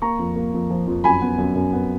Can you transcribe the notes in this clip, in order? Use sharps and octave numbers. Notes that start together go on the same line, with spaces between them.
A#3 A#5 C#6
F2
A#3
F2
F3
F2
F#2 G#5 B5
B3
F#2
F#2
B3